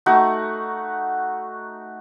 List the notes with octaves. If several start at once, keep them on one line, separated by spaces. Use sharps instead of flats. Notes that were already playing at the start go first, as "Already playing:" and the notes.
A3 D#4 F#4